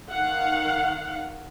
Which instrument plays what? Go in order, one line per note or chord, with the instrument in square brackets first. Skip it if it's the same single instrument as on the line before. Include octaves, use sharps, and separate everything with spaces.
[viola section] D#3 F5 F#5